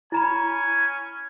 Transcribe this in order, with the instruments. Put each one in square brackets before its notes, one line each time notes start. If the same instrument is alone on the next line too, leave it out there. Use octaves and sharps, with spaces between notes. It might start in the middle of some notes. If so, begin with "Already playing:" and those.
[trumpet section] C#4 G#5 [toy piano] E4 A#5 B5